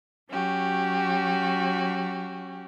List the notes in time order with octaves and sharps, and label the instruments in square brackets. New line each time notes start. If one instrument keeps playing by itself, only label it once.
[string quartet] F#3 C#4 F#4 G4